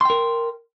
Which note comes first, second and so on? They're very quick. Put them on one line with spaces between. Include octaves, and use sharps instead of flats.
C6 G5 A#4